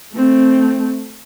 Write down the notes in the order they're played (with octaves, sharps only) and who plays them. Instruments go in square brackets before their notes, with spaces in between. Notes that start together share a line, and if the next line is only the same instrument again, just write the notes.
[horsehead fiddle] A3 C4